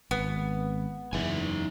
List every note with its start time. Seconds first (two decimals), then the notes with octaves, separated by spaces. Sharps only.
0.11 G#1 B3
1.13 F#1 E2 D#4 E5 G#5